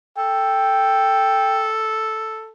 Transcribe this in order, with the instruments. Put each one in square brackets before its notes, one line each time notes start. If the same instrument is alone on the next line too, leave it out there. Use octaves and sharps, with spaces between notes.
[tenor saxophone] A4 [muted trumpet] G5